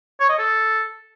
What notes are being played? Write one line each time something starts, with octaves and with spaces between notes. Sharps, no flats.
C#5
D#5
A4